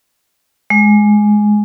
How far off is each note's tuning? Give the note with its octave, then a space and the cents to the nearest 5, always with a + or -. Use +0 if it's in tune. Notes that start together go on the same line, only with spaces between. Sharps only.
G#3 +10